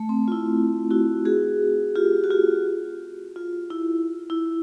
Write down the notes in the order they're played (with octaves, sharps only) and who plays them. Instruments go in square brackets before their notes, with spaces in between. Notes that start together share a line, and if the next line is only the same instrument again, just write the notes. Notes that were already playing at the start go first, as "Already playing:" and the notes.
Already playing: [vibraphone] A3
C4
F4
E4
E4 F#4
F#4 G#4
F4 G4
F#4
F4 G4
F4
E4
E4